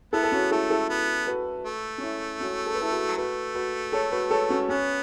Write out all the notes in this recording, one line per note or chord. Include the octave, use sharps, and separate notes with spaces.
B3 E4 A4
A4
C#4 F#4
A3 E4 A4
E4 A4
B3
F#4 B4
A3
C#4
E4
C#4 F#4
A4
B4
E4 A4
F#4 B4
F#3
A3 F#4 B4
F#4 B4
A4 C#5
F#4 B4
A4 C#5
C#4 F#4
B3 C#4